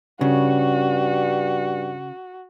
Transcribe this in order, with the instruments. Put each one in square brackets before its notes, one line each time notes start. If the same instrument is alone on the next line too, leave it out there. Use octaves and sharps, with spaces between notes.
[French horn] G2 [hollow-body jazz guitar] C#3 [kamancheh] F#4